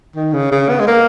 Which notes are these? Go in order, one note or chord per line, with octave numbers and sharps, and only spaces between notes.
D#3
C#3
C#3
B3
G#3
A#3